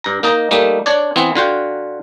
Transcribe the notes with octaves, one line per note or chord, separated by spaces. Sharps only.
G2 A#5
A#3 D#4 D#5 A#5
G3 A3 A#3 D#4
D4 C#5 D5
E3 B3 C4
D3 F4 F#4 G5